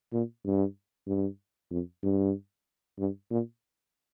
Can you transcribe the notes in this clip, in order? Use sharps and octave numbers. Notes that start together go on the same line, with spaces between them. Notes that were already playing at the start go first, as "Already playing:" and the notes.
A#2
G2
G2
F2
G2
G2
A#2